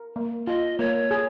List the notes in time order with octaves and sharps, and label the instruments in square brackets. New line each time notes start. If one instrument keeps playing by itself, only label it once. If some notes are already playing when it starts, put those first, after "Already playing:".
Already playing: [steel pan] A#4
A#3
[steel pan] F4 [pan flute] D#5
[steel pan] A#3 [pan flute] C#5
[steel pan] G#4